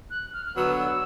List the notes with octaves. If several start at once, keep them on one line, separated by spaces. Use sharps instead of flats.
F#6
F6
F6
D3 F#3 B3 E6
E6